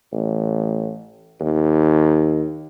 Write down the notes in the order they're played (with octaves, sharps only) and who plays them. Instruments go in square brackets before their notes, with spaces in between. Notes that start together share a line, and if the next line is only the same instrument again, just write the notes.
[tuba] A1
D#2